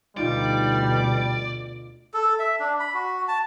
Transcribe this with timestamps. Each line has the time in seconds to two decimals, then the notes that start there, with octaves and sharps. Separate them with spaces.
0.17 D2 B2 G3 D#4 F4 D5
2.14 A4
2.39 E5
2.60 D4
2.80 B5
2.94 F#4
3.28 A5